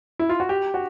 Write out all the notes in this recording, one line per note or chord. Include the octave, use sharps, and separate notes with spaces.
E4
F4
F#4
G4
F#4